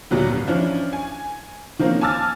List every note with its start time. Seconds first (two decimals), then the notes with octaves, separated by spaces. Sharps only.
0.11 D2 A#2 F#3 G3 B3
0.31 G#1
0.47 E3 F3 C#4 D4
0.93 G#5
1.79 D#3 F3 A#3 C4 C#4
2.01 G#5 A5 D6 E6 F6 A6